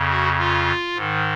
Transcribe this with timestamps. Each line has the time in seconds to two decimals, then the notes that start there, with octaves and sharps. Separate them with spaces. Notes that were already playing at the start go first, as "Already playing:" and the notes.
Already playing: F2 C#3
0.09 F#4
0.38 F4
0.95 G#2 D#3